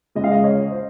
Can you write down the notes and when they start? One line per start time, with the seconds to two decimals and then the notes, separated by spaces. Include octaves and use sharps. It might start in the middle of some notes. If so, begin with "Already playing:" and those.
0.15 C#2 C#3 G#3 D#5
0.24 F5
0.32 D#5
0.44 C#5
0.71 C5